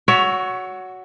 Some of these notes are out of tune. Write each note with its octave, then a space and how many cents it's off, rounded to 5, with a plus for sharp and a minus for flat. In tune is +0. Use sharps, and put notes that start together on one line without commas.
F#4 +0 C#5 +25 E5 +0